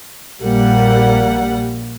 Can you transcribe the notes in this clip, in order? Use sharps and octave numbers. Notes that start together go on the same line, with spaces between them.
A#1 G3 A#3 F#5